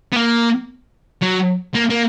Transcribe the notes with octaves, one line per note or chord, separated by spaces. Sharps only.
B3
A#3
F#3
A#3
A#3